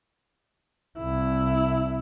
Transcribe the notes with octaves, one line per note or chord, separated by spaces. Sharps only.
C2 E4